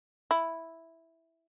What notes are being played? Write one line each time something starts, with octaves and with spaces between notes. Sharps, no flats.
E4